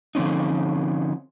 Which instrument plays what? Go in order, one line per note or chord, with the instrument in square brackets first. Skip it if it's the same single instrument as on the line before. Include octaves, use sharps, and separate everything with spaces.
[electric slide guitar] D3 F3 C4 C#4 D#4